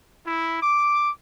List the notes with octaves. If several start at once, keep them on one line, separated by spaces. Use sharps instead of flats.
E4
D6